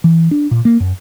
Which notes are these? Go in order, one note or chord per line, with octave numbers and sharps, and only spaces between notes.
E3
D4
A#2
A#3
F#2